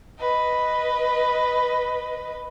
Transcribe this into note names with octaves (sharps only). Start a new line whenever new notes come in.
B4 D#5